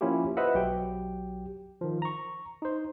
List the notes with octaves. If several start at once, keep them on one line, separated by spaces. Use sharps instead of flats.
F3 A#3 C#4 E4 F4 G4
F4 B4 C5 D#5 E5 F#5
B1 F#3 G4 G5
D#3 F3
A#5 C#6
D#4 C5